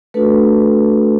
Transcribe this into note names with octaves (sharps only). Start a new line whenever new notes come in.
A3 D4 F#4 A4 B4